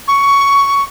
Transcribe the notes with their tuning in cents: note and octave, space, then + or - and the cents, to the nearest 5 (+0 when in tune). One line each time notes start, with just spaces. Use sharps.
C#6 +10